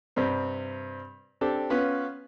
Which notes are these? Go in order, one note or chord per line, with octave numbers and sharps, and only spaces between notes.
G2 C3 G3 C4
C4 D4 G4 A4
B3 C#4 F4 B4